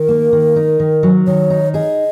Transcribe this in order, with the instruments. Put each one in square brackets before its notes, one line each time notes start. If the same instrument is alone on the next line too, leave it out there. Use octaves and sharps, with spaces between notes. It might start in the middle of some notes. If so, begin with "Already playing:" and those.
Already playing: [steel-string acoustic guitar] D#3 [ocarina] A#4
[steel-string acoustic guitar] A#3
D#3
D#4
D#3
F#3
[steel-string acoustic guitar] D#3 [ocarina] C#5
[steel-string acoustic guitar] D#4
[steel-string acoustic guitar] G#4 [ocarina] D#5